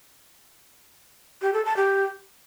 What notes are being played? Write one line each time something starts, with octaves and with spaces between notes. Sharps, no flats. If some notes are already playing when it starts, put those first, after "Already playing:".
G4
A4
A5
G4